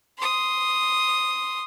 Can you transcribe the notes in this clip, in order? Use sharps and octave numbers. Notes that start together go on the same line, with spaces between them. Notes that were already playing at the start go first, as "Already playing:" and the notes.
C6 D#6